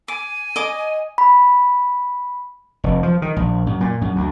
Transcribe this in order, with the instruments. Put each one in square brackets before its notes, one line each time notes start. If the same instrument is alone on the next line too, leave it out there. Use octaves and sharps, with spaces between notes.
[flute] G#5 [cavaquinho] D6
[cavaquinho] D#5 D6
[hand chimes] B5
[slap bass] F1
F3
D#3
A#1
F#2
A#2
F#2
D2